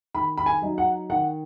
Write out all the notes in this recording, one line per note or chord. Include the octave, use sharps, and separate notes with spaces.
D#3 B5
B5
G#5
F#3 D#4
F#5
D#3 F#5